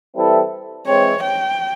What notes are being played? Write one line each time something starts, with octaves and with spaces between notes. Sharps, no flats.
E3 G3 C4 E4 A4
E3 G#3 C4 C#5
G5